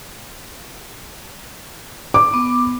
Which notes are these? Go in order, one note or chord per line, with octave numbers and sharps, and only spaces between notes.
D6
B3